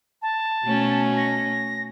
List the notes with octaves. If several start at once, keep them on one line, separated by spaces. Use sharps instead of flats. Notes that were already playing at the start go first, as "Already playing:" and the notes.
A5
B2 A3 C#4
A#6